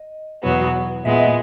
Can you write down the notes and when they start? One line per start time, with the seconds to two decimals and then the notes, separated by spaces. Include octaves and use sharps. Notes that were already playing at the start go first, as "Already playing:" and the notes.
Already playing: D#5
0.43 E2 B2 F#3 B3 F#4
1.05 A#2 G#3 B3 E5
1.19 D#5